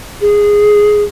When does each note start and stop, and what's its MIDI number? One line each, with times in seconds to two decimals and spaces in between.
0.21 1.03 68